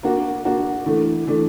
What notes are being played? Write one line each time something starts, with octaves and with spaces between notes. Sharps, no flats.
A#3 D4 F#4
A#3 D4 F#4
E3 A3 D4
E3 A3 D4